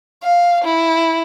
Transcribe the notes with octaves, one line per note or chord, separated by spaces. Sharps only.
F5
E4